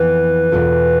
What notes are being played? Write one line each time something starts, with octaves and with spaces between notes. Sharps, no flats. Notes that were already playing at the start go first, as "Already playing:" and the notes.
Already playing: F2 E3 B3 B4
E2 B2 B3 F4 A4